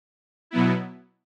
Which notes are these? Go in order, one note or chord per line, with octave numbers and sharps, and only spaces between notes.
B2 F#3 B3 E4